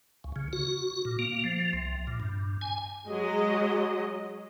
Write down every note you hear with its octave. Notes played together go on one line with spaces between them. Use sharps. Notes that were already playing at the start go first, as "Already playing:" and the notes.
C#2
C#3
F#4
A#2
A#3
F3
C2
A#2
G2
G#5
F#3 G#3 D#5